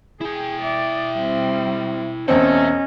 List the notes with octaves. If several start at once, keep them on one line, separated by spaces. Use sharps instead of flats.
E4 G#4 G5
D5 E5
G3 C4
E1 E2 C4 C#4 A4 D#5 E5